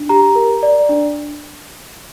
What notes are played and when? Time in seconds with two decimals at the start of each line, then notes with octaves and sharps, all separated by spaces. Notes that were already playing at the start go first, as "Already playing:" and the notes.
Already playing: D4
0.09 G4 A#5
0.35 A#4
0.63 D5
0.89 D4